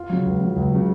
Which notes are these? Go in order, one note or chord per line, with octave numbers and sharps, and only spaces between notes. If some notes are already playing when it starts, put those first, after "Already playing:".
Already playing: F4 F5
C#3 F#3
C#2
C#3 F#3
C#2
C#3 F#3